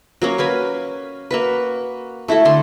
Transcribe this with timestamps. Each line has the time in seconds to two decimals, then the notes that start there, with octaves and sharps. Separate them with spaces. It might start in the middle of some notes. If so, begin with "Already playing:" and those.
0.22 F#3 A#3 C#4
0.38 B4 F5 G#5 B5
1.31 A#3 F#4 B4
2.28 A3 E4 F#4 A4
2.45 D3 A4 C6